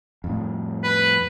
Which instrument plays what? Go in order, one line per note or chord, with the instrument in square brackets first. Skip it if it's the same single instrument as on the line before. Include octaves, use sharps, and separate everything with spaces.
[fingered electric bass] F2 A2
[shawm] B4